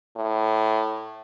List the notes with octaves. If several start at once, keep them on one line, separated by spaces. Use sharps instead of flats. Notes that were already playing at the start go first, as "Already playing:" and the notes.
A2